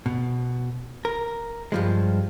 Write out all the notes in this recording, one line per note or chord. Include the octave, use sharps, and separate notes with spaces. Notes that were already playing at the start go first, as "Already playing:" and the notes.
B2
A#4
G2 F3 G#3